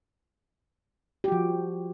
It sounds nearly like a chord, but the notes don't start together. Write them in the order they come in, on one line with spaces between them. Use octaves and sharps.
G4 F#4 F3